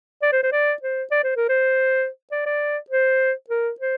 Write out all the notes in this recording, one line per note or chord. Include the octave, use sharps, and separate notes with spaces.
D5
C5
C5
D5
C5
D5
C5
A#4
C5
D5
D5
C5
A#4
C5